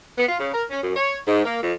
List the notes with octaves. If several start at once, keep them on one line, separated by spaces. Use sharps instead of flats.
B3
F4
C#3
A#4
C#4
F#2
C#5
G#2
A#3
F2